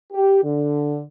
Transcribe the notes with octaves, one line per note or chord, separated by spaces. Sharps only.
G4
D3